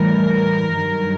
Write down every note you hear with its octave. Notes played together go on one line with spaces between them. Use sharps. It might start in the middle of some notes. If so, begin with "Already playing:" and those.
Already playing: A2 E3 G3 A#4
G2 D#3 F#3